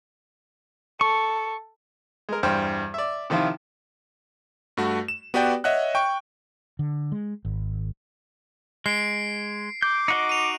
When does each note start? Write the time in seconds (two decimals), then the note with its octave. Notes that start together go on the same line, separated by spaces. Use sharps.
1.01 A4 C#6
2.29 G#3 A#4
2.43 E2 G2 C5 G5 F6
2.94 D5 E5
3.30 C3 D#3 F3 E4 F4
4.77 G2 A3 F#4
5.08 E7
5.34 B3 F#4 G4 B4 D5 G5
5.64 C#5 D#5 E5 F#5 F#6
5.95 G5 C#6
6.79 D3
7.12 G#3
7.45 G#1
8.86 G#3 C7 D7
9.82 D6 G6
10.08 D#4 F#4 D#5
10.29 D#7 F7